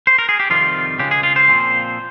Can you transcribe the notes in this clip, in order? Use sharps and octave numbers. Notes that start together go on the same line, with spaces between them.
C5
A#4
G#4
G4
F2 C3 D#3 G3 F4
C#2 C#3 G#3 G4
G#4
F4
C5
A#2 F3 C4